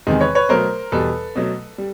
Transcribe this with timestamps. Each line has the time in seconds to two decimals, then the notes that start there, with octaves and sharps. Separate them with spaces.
0.07 E2 C3 D#3 G#3
0.21 B4 C#5
0.35 B4 C#5
0.49 B2 F#3 A3 A#4 C5
0.92 E2 B2 G3 A4 B4
1.36 B2 F#3 A3
1.78 G3